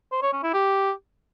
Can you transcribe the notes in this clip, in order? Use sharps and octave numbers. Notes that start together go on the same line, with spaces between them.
C5
C#5
C#4
E4
G4